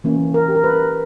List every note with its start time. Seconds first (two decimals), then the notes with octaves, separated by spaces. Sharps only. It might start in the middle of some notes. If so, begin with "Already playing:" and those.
0.04 E3 A#3 C#4
0.34 A#4
0.48 G4
0.56 A#4
0.64 B4